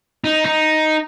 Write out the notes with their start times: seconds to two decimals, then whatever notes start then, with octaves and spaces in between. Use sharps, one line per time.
0.24 D#4
0.45 D#4